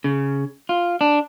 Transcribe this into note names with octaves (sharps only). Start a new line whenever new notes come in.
C#3
F4
D4